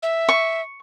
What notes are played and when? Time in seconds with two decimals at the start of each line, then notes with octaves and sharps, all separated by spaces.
0.03 E5
0.29 C#6